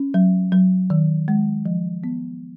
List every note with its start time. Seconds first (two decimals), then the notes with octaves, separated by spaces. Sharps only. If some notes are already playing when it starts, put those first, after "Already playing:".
Already playing: C#4
0.14 F#3
0.52 F#3
0.90 D#3
1.28 G#3
1.66 F3
2.04 B3